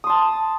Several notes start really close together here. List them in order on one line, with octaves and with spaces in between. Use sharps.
D#6 C6 A5